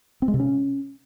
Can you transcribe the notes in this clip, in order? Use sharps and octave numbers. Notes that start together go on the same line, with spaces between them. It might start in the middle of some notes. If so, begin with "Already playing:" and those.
C4
G#3
C3
C#4